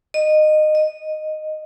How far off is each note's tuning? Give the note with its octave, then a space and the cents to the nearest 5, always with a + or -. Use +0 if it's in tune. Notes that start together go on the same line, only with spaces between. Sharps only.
D#5 -20
D#5 -10